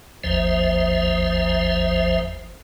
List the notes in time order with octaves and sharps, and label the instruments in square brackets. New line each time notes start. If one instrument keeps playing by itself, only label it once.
[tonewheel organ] G#1 D#2 F3 C5 E5